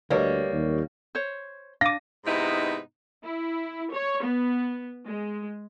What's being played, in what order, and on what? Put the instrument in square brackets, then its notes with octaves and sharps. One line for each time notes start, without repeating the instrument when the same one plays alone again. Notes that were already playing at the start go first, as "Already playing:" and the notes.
[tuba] D2 [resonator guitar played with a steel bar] G3 A#3 [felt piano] B4 C#5 D#5
[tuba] D#2
[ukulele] C5 C#5
[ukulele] D4 [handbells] F5 D6 [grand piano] A#6 D#7
[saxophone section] G#2 C3 B3 D#4 E4
[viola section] E4
C#5
B3
G#3